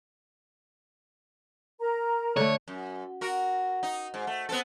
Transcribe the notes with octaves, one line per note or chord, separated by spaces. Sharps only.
A#4 A#5
D3 A3 C#5
F#2
F#4 A#4
D#4
G#2
A3
B3 C4 A4